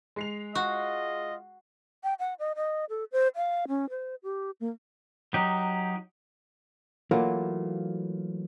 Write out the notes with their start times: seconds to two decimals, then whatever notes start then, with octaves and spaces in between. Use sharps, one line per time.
0.16 G#3 C7 F7
0.55 F4 F#4 D#5
2.04 G5
2.19 F#5
2.39 D#5
2.56 D#5
2.90 A4
3.12 C5
3.36 F5
3.68 C#4
3.90 C5
4.23 G4
4.60 A#3
5.34 F#3 D#4 G4
7.11 E3 F#3 A3 A#3 F4